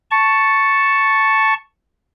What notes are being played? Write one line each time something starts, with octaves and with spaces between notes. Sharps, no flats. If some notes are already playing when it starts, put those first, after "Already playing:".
A5 C#6